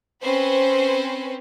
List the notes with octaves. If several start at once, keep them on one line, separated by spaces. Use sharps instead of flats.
C4 C#4 B4 C5